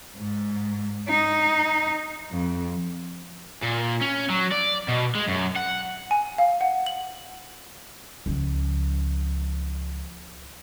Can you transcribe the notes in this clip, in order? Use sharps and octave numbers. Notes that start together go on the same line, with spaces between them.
G#2
D#4
F2
A#2
C#4
F#3
D5
B2
G#3
F#2
F#5
G#5
F5
F#5
F#7
C#2 F3